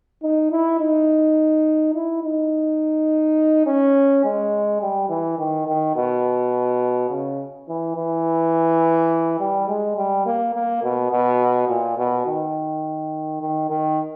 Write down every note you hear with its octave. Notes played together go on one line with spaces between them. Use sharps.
D#4
E4
D#4
E4
D#4
C#4
G#3
G3
E3
D#3
D#3
B2
C#3
E3
E3
G3
G#3
G3
A#3
A#3
B2
B2
A#2
B2
D#3
D#3
D#3